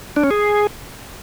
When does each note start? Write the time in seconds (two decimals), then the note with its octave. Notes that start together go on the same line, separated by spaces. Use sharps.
0.16 D4
0.24 C#4
0.31 G#4